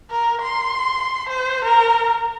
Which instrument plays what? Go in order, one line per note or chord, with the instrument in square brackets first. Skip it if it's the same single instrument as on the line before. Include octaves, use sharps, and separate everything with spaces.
[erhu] A#4
C6
C5
A#4